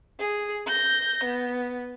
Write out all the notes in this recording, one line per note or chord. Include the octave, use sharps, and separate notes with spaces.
G#4
G6 A#6
B3